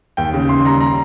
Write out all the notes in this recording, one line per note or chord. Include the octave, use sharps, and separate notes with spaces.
D#2 G5
C#3
D#2 C6
G3 A#5
A#5